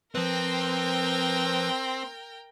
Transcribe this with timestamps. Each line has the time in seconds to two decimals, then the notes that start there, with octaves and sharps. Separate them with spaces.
0.15 F3 C4 A#4 B4 G5